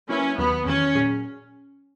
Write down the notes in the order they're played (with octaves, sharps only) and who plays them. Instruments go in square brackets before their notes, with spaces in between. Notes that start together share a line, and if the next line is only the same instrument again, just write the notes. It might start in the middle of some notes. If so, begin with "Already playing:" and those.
[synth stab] F#3 A#3 E4 B4 E5 [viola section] C#4
[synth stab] D#2 D#3 F#3 [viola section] B3
[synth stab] E2 D#3 F#3 [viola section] C#4
[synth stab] A#2 F#3 C#4 G#4